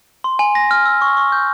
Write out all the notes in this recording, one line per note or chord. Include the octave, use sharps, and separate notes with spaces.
C6
G#5
A#6
F6
E6
C#6
C#6
G6